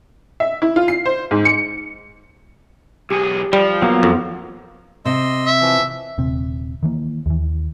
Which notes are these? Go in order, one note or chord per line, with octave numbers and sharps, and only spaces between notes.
E5
E4
F4
C7
C5
G#2
C#7
B1 G4 G#4
F3 G3
F#3 A#3 B3
F2
C3 D#5 C6 E6
E5
E3 F3
D#1 C3 C4
D#3 E3 A#3
D#2 E3